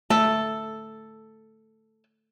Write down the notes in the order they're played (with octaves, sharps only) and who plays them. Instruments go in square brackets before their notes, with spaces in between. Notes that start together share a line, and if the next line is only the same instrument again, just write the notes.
[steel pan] A3 [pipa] A4